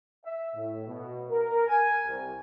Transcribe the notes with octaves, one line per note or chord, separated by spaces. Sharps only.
E5
A2
B2
A#4
G#5
C2